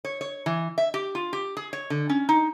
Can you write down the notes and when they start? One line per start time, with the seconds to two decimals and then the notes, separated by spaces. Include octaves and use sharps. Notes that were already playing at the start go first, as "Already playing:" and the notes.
0.05 C#5
0.21 C#5
0.46 E3
0.78 E5
0.94 G4
1.15 F4
1.33 G4
1.57 G#4
1.73 C#5
1.90 D3
2.09 C#4
2.29 D#4